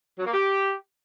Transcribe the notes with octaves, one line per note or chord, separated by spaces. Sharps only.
F#3
A#3
G4